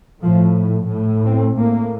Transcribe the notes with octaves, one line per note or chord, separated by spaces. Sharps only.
A2 F3
A2
C4
A2 A#3